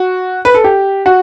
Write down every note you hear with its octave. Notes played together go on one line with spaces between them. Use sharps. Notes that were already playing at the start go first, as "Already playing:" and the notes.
Already playing: F#4
B4
A4
G4
F#4